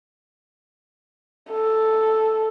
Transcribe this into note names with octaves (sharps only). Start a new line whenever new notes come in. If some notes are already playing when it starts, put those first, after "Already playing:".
A4